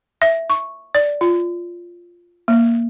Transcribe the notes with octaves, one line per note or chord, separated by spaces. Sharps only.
E5
C#6
D5
F4
A#3